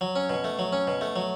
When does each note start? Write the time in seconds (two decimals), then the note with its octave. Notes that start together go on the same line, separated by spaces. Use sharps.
0.01 F#3
0.16 C#4
0.29 B2
0.44 A3
0.59 F#3
0.73 C#4
0.87 B2
1.01 A3
1.16 F#3